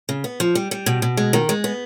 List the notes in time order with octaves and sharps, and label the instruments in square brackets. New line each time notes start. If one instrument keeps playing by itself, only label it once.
[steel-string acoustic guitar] C#3
B3
F3
G3
G3
B2
B2
G#3
D#3
G#3
B3